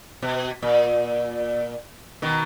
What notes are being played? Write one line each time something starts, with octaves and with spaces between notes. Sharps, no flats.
B2
A#2
B2 D#3